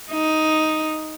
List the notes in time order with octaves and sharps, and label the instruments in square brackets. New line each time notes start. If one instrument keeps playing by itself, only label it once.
[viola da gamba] D#4